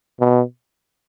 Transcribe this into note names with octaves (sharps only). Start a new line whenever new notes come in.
B2